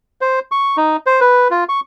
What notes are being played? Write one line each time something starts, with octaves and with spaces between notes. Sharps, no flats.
C5
C#6
D#4
C5
B4
F4
C#6